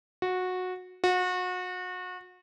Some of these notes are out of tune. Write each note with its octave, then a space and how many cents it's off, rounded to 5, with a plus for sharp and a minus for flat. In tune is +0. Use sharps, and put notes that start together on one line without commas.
F#4 -15
F#4 -30